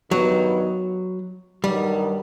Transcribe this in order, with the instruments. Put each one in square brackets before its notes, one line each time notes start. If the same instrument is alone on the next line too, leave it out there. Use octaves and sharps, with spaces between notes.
[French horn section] G2 D#3 G3 B3 [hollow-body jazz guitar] F#3
[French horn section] G2 D#3 F#3 [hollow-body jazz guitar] G3